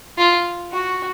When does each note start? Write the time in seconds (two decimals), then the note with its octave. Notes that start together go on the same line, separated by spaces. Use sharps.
0.18 F4
0.73 F#4